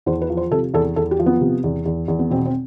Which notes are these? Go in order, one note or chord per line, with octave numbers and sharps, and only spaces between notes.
E2 C5
B4
F3
C5
C3 A4
E2 A4
E2 A4
G4
F3
B3
C3
E2
E2
E2
B3
B2 C4
C4